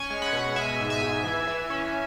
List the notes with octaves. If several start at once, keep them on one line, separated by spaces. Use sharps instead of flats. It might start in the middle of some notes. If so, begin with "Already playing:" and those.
Already playing: C#4 G#5 C#6
G#3
F#5 B5
B2
G#3 E5 G#5
G#2
E5 G#5
G#2
E3
E3
C#4